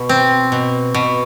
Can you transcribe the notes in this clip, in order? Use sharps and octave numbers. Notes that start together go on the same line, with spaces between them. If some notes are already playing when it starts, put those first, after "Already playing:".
Already playing: B2
C4
B2
B2